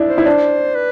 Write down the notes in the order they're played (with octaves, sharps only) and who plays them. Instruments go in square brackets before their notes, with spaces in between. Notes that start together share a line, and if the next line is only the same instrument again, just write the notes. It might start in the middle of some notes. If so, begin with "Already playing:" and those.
Already playing: [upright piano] D4 E4
[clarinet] C5
[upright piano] E4
D4
[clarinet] B4